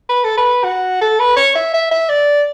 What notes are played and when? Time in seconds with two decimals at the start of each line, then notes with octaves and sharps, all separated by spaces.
0.09 B4
0.24 A4
0.37 B4
0.64 F#4
1.01 A4
1.19 B4
1.36 C#5
1.55 E5
1.74 E5
1.91 E5
2.09 D5